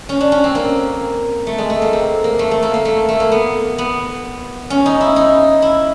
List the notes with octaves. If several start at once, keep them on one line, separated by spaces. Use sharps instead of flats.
C#4
D4
C#4
C4
A#3
A3
G#3
A3
A#3
C4
A#3
A3
A3
A#3
A#3
A3
A3
A#3
B3
B3
C#4
D#4
E4
D#4
E4